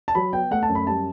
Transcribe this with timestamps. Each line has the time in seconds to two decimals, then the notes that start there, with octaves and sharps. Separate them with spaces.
0.08 A5
0.15 F#3 B5
0.33 B3 G5
0.51 A3 F#5
0.63 A5
0.69 F#2
0.75 B5
0.87 G3 A5